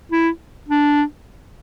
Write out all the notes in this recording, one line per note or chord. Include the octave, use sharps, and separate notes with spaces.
E4
D4